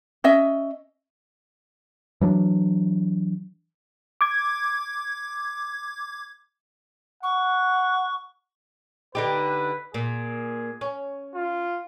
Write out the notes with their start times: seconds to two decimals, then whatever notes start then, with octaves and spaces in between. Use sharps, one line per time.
0.24 C#4 D#5 E5
2.21 E3 F#3 G#3 D4
4.21 D6 G#6
7.23 F#5 C#6
9.15 D3 D#4 G4 B4
9.94 A#2 G#4
10.81 C#4
11.34 F4